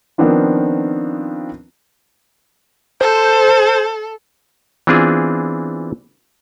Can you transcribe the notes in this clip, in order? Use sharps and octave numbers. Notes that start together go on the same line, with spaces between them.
D#3 F3 B3 C4 D4 F4
A4 C5
E3 B3 C4 D4 F4 G#4